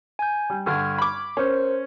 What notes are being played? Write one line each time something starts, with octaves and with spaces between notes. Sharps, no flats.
G#5 G6
G3
G2 D3 C#6 F6 G#6
B5 D6
C#4 A#4 C5